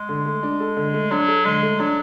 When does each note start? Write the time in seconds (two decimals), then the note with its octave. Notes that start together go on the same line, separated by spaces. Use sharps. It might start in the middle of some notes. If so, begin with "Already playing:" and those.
Already playing: G#3
0.09 D3
0.26 A3
0.43 D4
0.60 A4
0.77 D3
0.94 A3
1.11 F#3 D4
1.28 A4
1.45 D3 G#3
1.63 A3
1.79 F#3 D4